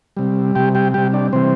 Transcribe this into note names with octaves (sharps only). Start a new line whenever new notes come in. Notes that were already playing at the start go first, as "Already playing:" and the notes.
C3 G3
C3 G3 G4 G5
G4 G5
C3 G3 G4 G5
D4 D5
C3 E3 G3 C4 C5